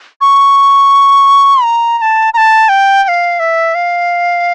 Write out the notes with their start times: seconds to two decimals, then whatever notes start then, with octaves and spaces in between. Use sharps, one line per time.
0.21 C#6
1.63 A#5
1.98 A#5
2.02 A5
2.34 A#5
2.37 A5
2.69 G5
3.04 G5
3.08 F5
3.40 E5
3.75 F5